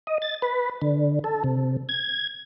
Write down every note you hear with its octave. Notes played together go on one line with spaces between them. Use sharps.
D#5
A6
B4
D3
A4
C3
G#6